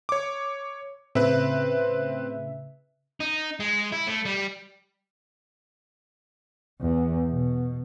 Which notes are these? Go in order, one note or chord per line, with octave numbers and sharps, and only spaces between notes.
C#5 D6
A2 C#3 C4 B4 E5
D#4
G#3
E4
A3
G3
E2
B2